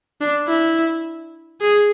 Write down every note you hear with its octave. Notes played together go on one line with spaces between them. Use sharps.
D4
E4
G#4